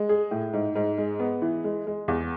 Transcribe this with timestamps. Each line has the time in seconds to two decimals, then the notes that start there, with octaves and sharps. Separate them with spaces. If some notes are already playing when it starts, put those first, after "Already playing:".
Already playing: G#3
0.09 G#4
0.31 A2
0.53 G#2
0.75 G#2
0.98 G#3
1.19 B3
1.42 E3
1.64 G#3
1.87 G#3
2.08 E2